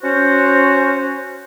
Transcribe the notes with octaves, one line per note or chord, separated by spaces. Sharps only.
C#4 F#4 C5